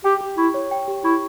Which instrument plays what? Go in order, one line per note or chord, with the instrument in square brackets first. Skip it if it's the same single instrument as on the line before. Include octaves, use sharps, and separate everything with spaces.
[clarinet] G4 [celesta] G5
[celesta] G4
[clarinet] E4 [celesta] C#6
[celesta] C#5
G5
G4
[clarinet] E4 [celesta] C#6